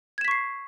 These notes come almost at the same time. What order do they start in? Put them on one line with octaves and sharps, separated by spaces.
G#6 E7 B6 C#6 C7